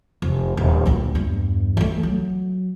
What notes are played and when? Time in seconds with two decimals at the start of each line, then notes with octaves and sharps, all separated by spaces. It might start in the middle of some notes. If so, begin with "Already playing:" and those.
0.22 F1
0.57 D#1
0.86 D2 A#2
1.15 E2 G2
1.77 E3 A3
2.03 F#3